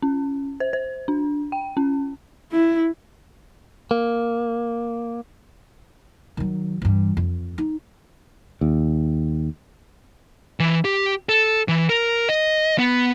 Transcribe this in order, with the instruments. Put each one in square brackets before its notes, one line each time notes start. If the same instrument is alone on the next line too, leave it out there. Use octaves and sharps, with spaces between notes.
[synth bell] C#4
C5
C5
D4
G5
C#4
[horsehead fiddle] E4
[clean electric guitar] A#3
[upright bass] D#3 F#3
G2 E3
F2
D#4
[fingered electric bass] D#2
[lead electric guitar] E3
G4
A4
E3
A#4
D#5
B3